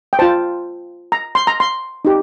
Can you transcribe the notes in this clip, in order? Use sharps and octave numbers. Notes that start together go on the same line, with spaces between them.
G5
F4 C5 A5
A#5
C6
A#5
C6
D#4 G4